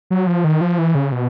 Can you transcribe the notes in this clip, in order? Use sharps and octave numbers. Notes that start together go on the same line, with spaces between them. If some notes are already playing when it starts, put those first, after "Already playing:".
F#3
F3
D#3
F3
E3
C#3
B2